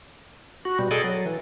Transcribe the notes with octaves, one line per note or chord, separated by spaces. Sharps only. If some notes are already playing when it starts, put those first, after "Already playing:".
F#4
B2 G3
G#4 A4 D5 D#5
F#3
E3